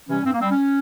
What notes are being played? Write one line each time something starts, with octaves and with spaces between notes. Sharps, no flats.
C3 E3 G3 C#4
G2 C4
A#3
G3 C4
C#4